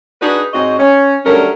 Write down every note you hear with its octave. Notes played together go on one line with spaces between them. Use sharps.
D4 D#4 F#4 G#4 B4
G#2 C4 F#4 C#5 D#5
C#4
D3 F#3 G3 A3 C#4 A#4